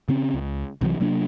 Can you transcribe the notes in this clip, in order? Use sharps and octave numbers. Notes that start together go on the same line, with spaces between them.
C#3 C4 C#4
C#2
C2 C3 E3 F#3
C3 F#3 A#3 D4